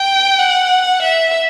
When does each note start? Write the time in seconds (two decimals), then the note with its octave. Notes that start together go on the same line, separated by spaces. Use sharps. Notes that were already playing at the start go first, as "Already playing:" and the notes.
Already playing: G5
0.39 F#5
1.03 E5